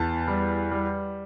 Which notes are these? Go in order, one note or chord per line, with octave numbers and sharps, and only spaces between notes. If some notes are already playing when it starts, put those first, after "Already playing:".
Already playing: E2 A5
G3
G3